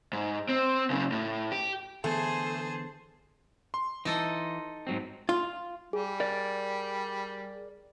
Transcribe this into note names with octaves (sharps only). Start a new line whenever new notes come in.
G#2
C4
F#2 C#3
A2
G4
D3 E3 A3 B3 G#4 C5 A5
C6
E3 D#4 A4 D#5
G#2 F#3 C4
F4
G3 G#4
A#4 D5